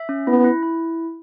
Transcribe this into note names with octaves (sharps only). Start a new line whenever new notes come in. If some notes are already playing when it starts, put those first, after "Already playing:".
Already playing: E5
C#4
B3 E4
E4
E4